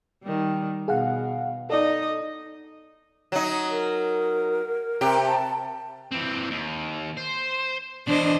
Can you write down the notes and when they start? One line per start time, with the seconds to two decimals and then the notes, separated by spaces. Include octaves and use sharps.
0.23 D#3 G3
0.88 B2 G#4 F5 F#5
1.70 D#4 A4 D5 D#5
3.32 F#3 D#4
3.71 A#4
5.01 C3 G4
5.26 A5
6.11 E3 C4
6.50 D#2
7.17 C5
8.07 E2 B2 D4 C5 D#5